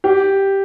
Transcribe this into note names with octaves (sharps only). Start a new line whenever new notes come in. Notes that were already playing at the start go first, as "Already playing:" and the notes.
G4